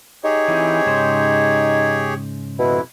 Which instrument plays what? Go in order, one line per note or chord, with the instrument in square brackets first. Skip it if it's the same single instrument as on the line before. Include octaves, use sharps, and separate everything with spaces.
[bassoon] D#4 [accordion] G4 G#4 C#5
[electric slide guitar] E3 C4
G#2 C#3 C5
[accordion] F2 E4 [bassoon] B2